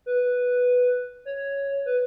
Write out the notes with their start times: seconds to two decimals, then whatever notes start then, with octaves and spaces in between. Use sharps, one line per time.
0.06 B4
1.25 C#5
1.86 B4